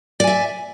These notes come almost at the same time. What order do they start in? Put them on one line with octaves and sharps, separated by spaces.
D5 G#5 E5